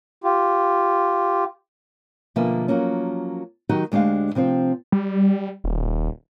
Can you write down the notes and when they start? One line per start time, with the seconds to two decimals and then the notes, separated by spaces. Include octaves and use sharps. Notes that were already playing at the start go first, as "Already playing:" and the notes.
0.24 F4 G4
2.36 B2 D3 F3 A#3 E5 G#5
2.68 F3 F#3 A#3 C#4
3.69 D#3 F#3 D#4 F#4 G4
3.92 D2 G#3 D4 G4 F5
4.35 C3 F3 C4 C5
4.92 G3
5.64 D#1